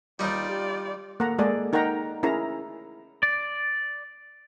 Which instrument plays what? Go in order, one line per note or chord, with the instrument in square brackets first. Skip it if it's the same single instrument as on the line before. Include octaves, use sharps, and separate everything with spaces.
[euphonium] D#2 [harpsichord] G3 D#4 [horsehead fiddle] F4 D5
[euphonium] G4
[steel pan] A#3 A4 F#5 A#5
G#3 A#3 G#4 A4 D5
D#4 A#4 F#5 G5 A#5
C#4 E4 G#4 A#4 A#5
[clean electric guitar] D5